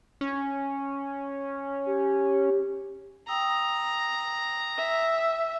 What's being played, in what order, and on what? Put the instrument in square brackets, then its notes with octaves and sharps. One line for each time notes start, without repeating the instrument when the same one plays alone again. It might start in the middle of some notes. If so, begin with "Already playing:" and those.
[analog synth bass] C#4
[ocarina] G4
[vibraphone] G5 D#6 E6 [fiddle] A#5
[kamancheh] E5